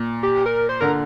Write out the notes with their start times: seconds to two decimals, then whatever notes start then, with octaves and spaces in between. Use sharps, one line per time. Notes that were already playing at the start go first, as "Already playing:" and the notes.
Already playing: A#2
0.23 G4
0.46 A#4
0.69 C5
0.81 D3 A#4